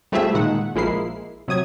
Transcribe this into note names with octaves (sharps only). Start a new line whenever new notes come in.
G3 A3 C4 F4 G#4 E5
A#2 D#3 G#3 F#5
A#1 F3 G#3 A#3 E4 C7
C3 F#3 D#6 G#6